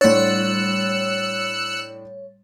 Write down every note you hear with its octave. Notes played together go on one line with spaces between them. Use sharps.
A2 G3 D4 C#5 E6 F#6 A6 C#7